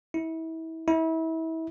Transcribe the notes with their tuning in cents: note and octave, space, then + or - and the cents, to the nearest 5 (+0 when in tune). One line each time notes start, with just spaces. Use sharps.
E4 -30
E4 -30